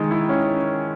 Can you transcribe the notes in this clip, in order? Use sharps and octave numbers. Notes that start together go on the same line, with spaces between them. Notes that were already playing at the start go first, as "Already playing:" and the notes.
Already playing: D#3 G#3
E4
C#4